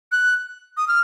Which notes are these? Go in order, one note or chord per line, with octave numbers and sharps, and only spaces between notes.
F#6
D#6
F6